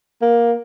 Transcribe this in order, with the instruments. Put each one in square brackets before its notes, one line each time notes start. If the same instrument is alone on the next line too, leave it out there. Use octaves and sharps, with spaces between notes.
[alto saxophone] A#3